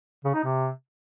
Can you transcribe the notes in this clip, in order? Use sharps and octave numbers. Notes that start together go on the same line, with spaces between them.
C#3
D#4
C3